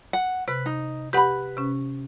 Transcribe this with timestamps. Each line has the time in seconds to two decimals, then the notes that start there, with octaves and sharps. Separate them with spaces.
0.13 F#5
0.48 C3 B4
0.66 D#4
1.13 G4 B4 F#5 B5
1.57 C3 C#4